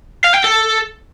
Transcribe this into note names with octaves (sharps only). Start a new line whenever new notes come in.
F5
G5
A4